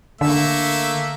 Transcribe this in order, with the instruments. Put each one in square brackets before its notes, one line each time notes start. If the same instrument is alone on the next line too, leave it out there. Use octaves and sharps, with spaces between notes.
[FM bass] D3 [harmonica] A3 A#3 E5